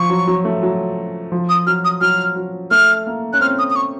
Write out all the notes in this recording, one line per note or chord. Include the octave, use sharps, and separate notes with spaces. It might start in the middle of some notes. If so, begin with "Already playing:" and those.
Already playing: F3 C#6
F#3
F#3
A3
F#3
F3
D#6
F#3 F6
D#6
F#3 F6
F#3
A3 F6
A#3
C#4 F#6
C4 F6
D#6
D#6
C#6